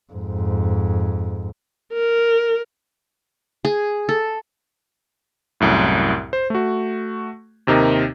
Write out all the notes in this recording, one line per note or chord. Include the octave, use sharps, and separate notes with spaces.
F2 G#2
A#4
G#4
A4
C2 F#2 A2
C5
A3 F#4
D#2 C3 D#4 A#4